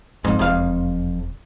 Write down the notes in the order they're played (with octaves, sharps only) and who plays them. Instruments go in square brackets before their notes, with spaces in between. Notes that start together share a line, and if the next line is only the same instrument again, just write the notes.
[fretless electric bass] G1 G#2 [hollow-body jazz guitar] F2
[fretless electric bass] E1 [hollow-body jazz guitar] F2 F5